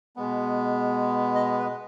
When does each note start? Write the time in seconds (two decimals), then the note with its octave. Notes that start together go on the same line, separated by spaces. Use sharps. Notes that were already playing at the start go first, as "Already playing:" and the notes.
0.16 B2 G#3 B3
1.35 D#5
1.59 B4